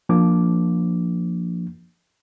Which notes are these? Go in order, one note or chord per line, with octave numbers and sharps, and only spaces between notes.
F3 A#3 D4 D6